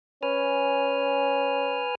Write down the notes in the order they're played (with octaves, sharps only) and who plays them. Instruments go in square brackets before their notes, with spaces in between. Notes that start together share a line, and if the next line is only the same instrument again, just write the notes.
[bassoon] C#4 [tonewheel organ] B4 G#5 F6